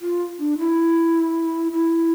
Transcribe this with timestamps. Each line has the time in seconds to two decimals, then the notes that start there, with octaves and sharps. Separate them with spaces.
0.01 F4
0.39 D4
0.59 E4
1.72 E4